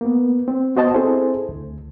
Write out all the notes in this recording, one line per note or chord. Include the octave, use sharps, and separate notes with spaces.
A#3 B3
C4
B3 F#4 C5 D#5 A5
C4 E4 G#4 A4 C5
D2